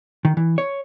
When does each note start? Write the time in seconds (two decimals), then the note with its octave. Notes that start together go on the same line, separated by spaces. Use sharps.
0.25 D#3
0.37 E3
0.58 C#5